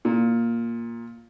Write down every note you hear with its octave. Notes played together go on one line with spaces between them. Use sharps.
A#2